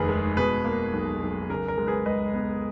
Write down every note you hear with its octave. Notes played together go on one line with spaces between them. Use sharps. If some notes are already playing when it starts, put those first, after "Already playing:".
Already playing: F1 D#2 D#3 G#4 A#4 B4
G#3
B2 G#4 B4
A#3
B1
B1
C#3 A#4
A#4
G#3
G#4 B4
C#2 B4 D#5
B3